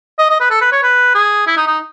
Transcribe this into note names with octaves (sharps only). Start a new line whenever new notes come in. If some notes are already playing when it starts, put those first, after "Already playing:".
D#5
D#5
B4
A4
B4
C#5
B4
G#4
E4
D#4
D#4